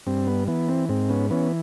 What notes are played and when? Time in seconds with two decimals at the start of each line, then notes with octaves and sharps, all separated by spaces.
0.06 G2 C4
0.27 B3
0.48 E3 B3
0.68 C4
0.89 G#2 C4
1.09 B3 C#4
1.31 E3 B3 C#4